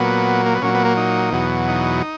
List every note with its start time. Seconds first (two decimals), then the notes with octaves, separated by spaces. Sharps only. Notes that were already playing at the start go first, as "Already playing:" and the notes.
Already playing: A#2 F#3 B3
0.46 A#3
0.55 B3
0.62 A#2 F#3 C#4
0.75 B3
0.85 A#3
0.97 D#4
1.32 E2 B2 F#3
1.68 D#4